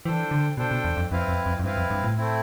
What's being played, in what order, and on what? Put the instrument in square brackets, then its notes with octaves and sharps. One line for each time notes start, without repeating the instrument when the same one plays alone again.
[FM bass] E3 [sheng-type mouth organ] D4 A4 C5 G5
[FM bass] D3
[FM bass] B2 [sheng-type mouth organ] D4 A4 C5 G5
[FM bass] B2
E2
F2
[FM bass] F2 [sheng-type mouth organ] C4 E4 B4 F5
[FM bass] F2
F2
F2
[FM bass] G2 [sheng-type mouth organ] C4 E4 B4 F5
[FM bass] F2
G2
A2
[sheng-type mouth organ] A3 C4 E4